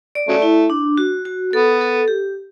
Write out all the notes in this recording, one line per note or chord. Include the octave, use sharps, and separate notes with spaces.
D5
C#3 F#3 A3
E4
D4
F#4
F#4
B3 A4
A4
G4